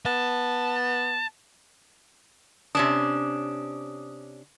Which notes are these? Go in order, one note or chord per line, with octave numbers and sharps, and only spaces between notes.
B3 A5
C3 C#4 D4 D#6